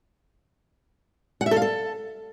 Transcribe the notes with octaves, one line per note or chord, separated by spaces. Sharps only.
F#5
E5
A4
F5
A4